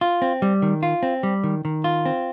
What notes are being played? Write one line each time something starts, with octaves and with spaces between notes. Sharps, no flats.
F4
C4
G3
D#3
F4
C4
G3
D#3
D#3
F4
C4